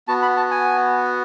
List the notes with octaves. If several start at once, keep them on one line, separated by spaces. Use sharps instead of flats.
B3 F#4 A5
B5
A5
G#5